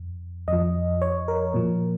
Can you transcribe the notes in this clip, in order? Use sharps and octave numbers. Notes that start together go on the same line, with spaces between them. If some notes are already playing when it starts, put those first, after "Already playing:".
Already playing: F2
F2 F3 D#5
C#5
A#4
A#2 F3